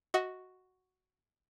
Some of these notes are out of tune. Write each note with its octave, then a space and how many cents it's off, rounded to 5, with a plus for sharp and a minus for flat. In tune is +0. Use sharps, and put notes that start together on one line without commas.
F#4 +0 D#5 +25